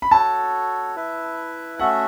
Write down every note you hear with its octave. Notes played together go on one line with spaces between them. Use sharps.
B5
F#4 A4 C#5 A5
E4 B4 E5
A3 C#4 F#4 A4 E5 F#5